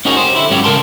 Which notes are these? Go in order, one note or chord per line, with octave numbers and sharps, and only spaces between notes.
C#4 D#4 F#4 G#4 A#4 C#5
G4 C5
D3 E4
G#2 F#3 C#4 F#4 G4
C#3 G3 A#4 A5 C6